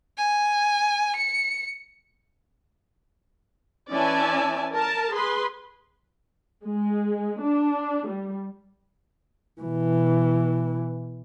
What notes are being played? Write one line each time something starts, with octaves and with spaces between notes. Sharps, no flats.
G#5
C#7
E3 C#4 D5 E5 G#5 A5
A#4 A5
G#4 B4 C6
G#3
D4
G3
B2 E3